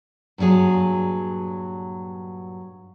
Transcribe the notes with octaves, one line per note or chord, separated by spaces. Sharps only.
G2 A#2 D3 F#3 G#4